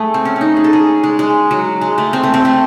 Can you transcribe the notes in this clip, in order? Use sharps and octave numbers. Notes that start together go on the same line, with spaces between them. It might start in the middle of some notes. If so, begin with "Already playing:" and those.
Already playing: A3 G#4
C4
C#4
C#4
D#4
G#4
A4
G#4
G#3
G#3
F#3
G#3
A3
C4
A3
C4
A3